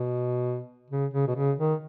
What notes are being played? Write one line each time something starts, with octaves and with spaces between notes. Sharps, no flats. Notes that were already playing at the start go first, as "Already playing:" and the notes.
Already playing: B2
C#3
C#3
B2
C#3
D#3